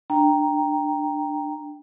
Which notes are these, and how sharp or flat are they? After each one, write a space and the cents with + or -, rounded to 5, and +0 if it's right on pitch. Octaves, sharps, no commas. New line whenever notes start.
D4 +15 G5 +5 A#5 +0